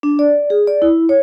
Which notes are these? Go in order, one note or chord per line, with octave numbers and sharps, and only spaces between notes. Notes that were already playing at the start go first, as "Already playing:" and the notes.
D4
D5
G#4
D5
E4
C#5